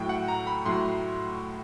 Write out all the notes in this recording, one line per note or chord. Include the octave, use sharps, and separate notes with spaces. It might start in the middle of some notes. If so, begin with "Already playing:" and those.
Already playing: A2 F#3 A3 G5
F#5
A#5
B5
A2 F#3 A3 C6